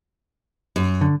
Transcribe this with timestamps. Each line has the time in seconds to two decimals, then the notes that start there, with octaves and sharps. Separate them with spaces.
0.76 F#2
1.01 D3